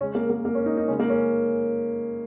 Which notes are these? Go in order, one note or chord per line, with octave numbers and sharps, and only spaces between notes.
C#3 G#3 C#4
A#3
A#3
A#3
C#4
D#4
D#4
C#3 G#3 C#4
A#3
C#4